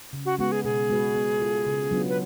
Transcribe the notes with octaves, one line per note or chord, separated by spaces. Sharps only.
C#3
F#4
G#3 B3 F#4
G#4
B2 G#4
G#3 B3 F#4 B4
B3
F4 A4
C#3
F#3 B3 D4 F4
B4